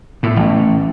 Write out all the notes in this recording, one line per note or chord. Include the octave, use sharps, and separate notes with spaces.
A2
A1